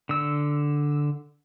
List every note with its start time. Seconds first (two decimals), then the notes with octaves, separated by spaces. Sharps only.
0.09 D3 E6